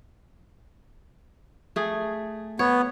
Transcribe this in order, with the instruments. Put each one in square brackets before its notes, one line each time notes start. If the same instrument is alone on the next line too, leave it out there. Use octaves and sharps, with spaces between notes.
[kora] A3 G#4
[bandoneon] B3 [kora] C#5